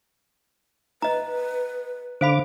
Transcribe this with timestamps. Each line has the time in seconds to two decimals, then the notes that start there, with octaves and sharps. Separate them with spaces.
1.02 B4 D#5 A#5
2.21 D3 C5 F5 B5 D6